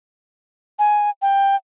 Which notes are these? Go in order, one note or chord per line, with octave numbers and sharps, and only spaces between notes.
G#5
G5